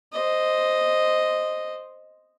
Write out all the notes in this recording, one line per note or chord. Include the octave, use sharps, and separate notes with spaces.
C5 D#5